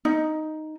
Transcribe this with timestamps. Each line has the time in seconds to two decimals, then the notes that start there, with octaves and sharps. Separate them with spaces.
0.05 D#4